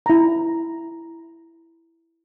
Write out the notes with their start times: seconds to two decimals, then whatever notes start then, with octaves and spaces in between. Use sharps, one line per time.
0.06 E4 A#5